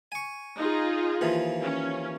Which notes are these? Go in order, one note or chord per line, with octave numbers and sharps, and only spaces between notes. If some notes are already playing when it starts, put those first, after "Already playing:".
G#5 C#6
D#4 F4 G#4
D#2 E3 F3
C#4